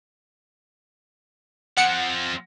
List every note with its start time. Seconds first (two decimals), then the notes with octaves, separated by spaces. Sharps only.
1.77 F3 C4 F#5 C#7 D7